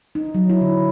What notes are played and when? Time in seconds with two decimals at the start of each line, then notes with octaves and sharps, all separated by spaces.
0.15 D#4
0.35 F#3
0.50 E4
0.61 D3